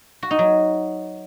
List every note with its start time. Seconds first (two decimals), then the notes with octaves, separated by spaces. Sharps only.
0.23 F#4
0.31 D#4
0.39 F#3